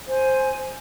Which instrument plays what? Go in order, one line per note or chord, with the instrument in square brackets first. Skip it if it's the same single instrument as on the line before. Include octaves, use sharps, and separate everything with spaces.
[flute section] C5 G#5